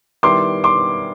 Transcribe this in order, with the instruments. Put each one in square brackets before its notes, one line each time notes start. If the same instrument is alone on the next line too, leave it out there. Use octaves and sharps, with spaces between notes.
[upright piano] D#3 G3 B3 E4 [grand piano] C6 D6
[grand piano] C6 D6